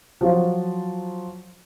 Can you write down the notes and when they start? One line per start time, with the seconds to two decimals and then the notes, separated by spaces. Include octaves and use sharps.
0.21 F3 F#3 F4